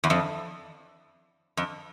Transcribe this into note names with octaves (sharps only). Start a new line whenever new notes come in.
E2
F2
F2